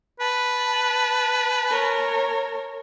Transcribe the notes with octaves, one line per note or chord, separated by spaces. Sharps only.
B4 A5
A#4 C#5